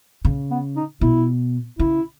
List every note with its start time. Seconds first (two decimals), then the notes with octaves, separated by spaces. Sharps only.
0.25 C#3
0.51 B3
0.76 D#4
1.01 B2 E4
1.79 C#3 E4